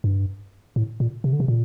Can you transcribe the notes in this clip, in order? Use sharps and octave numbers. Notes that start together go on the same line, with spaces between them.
G2
A2
A#2
C3
D3
C3
A#2